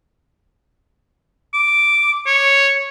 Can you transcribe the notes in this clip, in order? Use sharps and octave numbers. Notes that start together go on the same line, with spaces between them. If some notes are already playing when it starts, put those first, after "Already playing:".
D6
C#5